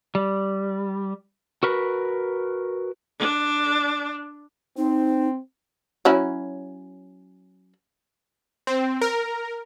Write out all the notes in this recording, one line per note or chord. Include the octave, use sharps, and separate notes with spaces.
G3
F#4 A#4 B4
D4
C4 D#4
F#3 C#4 E4
C4
A#4